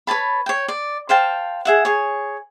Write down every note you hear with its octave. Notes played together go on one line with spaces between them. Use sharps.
B4 C#5 A5 B5
C#5 G5
D5
C5 F5 G5 A5
G#4 E5 F#5
G#4 C#5